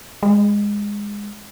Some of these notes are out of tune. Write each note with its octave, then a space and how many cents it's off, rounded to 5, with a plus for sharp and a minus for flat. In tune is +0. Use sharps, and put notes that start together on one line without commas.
G#3 -15